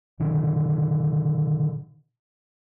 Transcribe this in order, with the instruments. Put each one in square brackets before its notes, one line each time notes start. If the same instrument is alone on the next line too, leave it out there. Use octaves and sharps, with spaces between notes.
[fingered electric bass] B2 D3 D#3